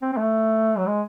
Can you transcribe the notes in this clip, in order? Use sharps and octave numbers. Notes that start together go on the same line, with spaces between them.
C4
C4
A3
F#3
G#3